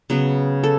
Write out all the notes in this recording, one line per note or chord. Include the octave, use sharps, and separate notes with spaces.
C#3 F#3 B3
A4